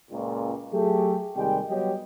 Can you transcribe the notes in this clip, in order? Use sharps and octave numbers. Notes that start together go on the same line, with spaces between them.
C#2 A#2
F#3 A3 G4 G#4
D#2 C3 G3 G#3 G5
F#3 G3 B3 G4 C#5 D#5